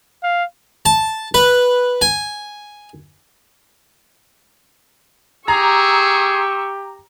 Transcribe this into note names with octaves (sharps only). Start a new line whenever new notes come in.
F5
A5
B4
G#5
G4 G#4 A#5 C#6 E6